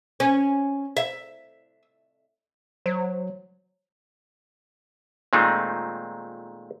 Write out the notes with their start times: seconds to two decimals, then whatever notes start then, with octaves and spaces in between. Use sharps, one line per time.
0.20 C#4
0.97 E5
2.86 F#3 C5
5.33 A#2 D#3 G#3 A3 C4 D#4